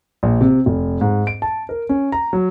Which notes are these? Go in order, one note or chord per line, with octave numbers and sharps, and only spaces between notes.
A#1
C3
F1
G#2
D7
A5
A#4
C#4
A#5
F#3